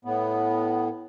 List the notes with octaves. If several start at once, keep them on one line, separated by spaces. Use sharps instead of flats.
A2 B3